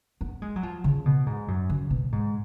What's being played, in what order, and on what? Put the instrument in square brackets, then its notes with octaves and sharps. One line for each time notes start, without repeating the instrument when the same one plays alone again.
[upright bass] B3
G#3
F#3
F3
C#3
B2
G#2
F#2
C#3
B2
G#2